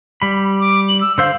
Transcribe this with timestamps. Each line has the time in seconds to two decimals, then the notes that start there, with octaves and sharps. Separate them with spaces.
0.22 G3 B5
0.60 D6
0.88 F#7
1.01 E6
1.18 D3 C5 F5 E6